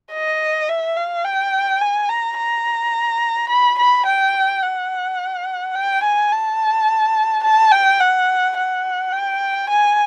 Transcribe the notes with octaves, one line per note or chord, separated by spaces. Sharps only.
D#5
E5
F5
G5
G#5
A#5
A#5
B5
B5
G5
F#5
G5
G#5
A5
A5
G5
F#5
F#5
G5
G#5